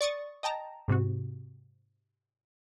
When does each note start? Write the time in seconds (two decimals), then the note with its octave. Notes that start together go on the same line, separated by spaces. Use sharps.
0.01 D5 C#6 D#6 A6
0.43 D#5 G5 A5 A#5
0.88 G#2 C3 C4 F#4